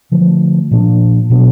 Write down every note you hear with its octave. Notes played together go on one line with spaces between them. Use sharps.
D3 F3 A3
A#2 F3 A#3 D4
B2 F#3 B3 D4